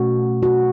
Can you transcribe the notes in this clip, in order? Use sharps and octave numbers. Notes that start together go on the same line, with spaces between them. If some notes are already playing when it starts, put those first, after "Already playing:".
Already playing: B2 A3 C#4 F#4
F#4